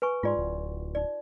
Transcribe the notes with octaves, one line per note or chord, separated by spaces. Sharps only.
B4 G#5 C#6
G#2 F4 D5 C6
D1
D#4 D5